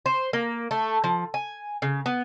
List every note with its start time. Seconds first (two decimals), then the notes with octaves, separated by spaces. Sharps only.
0.06 C5
0.33 A#3
0.71 A3
1.04 F3
1.34 G#5
1.82 C#3
2.06 B3